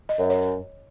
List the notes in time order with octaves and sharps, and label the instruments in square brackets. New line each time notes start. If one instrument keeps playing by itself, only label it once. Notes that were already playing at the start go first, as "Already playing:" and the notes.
[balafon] D#5
[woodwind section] F#2
[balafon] C#5